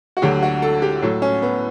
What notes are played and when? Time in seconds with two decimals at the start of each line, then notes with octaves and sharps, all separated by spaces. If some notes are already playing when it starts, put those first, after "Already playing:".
0.17 F#4
0.22 D2 D3 F#3 G4
0.43 F#4
0.62 A4
0.82 G4
1.02 A2 F#3 A4
1.22 C#4
1.42 B3